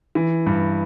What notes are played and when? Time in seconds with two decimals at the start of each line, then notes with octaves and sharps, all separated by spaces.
0.15 E3
0.46 G2